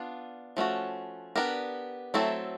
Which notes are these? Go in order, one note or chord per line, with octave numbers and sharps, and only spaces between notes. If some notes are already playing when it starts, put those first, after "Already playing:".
Already playing: B3 D4 F4
F3 A3 C#4 F#4
B3 D4 G4 A#4
F#3 A3 C4 E4 A4